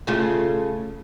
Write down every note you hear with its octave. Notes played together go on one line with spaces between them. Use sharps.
C#3 A3 F4